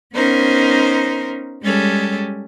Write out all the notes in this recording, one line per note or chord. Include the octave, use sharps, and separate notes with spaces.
B3 C#4 D#4 A#4 C5
G3 G#3 C#4 G4 A4